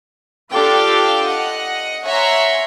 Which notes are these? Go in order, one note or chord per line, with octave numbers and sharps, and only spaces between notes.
D4 F4 G4 A4 F5 G5
D#5 F#5
C#5 E5 F#5 G#5 A#5 C6